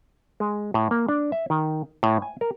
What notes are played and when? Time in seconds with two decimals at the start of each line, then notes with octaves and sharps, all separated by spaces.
0.40 G#3
0.74 A2
0.91 A#3
1.09 D4
1.32 E5
1.50 D#3
2.03 A2
2.22 G#5
2.41 A#4